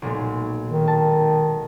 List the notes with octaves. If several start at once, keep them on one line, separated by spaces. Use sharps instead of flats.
B1 A#2 G#3
D#3
A5